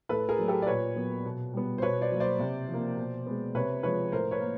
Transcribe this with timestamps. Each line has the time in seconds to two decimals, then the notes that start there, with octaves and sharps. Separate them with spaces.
0.09 A2 A4 B4
0.29 G#4 A#4
0.38 F#3 A3
0.48 G4 A4
0.62 D5
0.67 A#2 B4 C#5
0.96 F#3 B3
1.25 B2
1.53 G3 B3
1.78 C5
1.82 B2 B4 C#5
2.01 C5 D5
2.12 F#3 A#3
2.20 C5 D5
2.39 C3
2.68 F3
2.74 A#3
2.97 B2
3.26 G#3 B3
3.55 C3 B4 C#5
3.83 F3 G#3 B4 C#5
4.12 A2 A#4 C5
4.31 B4 C#5
4.41 A#3